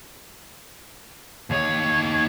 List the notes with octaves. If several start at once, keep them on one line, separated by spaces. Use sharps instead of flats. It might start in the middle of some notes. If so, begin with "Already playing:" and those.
D#2 C#5